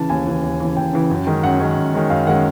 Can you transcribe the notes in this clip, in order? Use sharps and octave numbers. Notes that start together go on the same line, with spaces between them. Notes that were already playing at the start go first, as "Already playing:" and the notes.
Already playing: C#3 E3 A5
D#2 G#5
C#3 E3
D#2
C#3 E3
D#2 G5
C#3 E3
F#2
D#3 G#3 C#4
F#2 F#5
D#3 G#3 C#4
F#2
D#3 G#3 C#4
F#2 F5
D#3 G#3 C#4 F#5